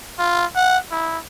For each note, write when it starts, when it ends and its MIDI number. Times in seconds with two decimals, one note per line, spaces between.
0.19 0.45 65
0.55 0.78 78
0.91 1.18 64